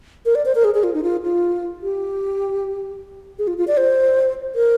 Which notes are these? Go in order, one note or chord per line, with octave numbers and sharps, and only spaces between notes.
A#4
D5
C5
A#4
G#4
G#4
F4
D#4
F4
F4
G4
G#4
F4
F4
D5
C5
A#4